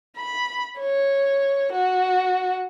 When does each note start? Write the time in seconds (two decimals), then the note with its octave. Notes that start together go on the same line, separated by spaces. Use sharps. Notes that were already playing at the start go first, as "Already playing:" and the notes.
0.17 B5
0.79 C#5
1.72 F#4